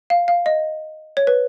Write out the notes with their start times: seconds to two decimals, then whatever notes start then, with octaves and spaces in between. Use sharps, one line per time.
0.10 F5
0.28 F5
0.46 D#5
1.17 C#5
1.27 B4